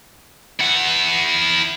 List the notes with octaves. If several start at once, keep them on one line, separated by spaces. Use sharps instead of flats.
E4 F#5